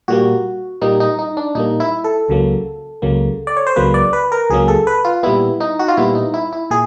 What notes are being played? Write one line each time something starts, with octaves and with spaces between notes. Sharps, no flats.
A#2 G3 A#3 F#4
A#2 G3 A#3 D#4
D#4
D#4
D4
A#2 G3 A#3 D#4
E4
A4
C#2 C#3 F#3 A#3
C#2 C#3 F#3 A#3
D5
C#5
C5
C#2 C#3 F#3 A#3 B4
D5
B4
A#4
C#2 C#3 F#3 A#3 G#4
A4
B4
F4
A#2 G3 B3 E4
D#4
F#4
F4
A#2 G3 B3 E4
D#4
E4
E4
A#2 G#4